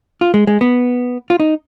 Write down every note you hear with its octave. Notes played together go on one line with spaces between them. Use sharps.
F4
G#3
G#3
B3
F4
D#4